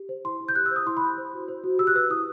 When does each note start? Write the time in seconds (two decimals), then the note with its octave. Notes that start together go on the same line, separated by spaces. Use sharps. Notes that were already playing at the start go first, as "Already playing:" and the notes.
Already playing: G4
0.09 C5
0.25 E4 C6
0.41 E4
0.48 G6
0.55 G4 F#6
0.66 E6
0.71 C5 D#6
0.86 E4 C6
0.97 B5
1.02 E4
1.18 C5
1.33 F#4
1.48 C5
1.64 F#4
1.79 G4 E6
1.87 F#6
1.95 B4 E6
2.10 E4 D#6